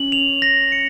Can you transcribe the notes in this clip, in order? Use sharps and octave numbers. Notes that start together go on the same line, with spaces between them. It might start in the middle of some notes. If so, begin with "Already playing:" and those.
Already playing: C#4 F#7
F7
A#6
C#7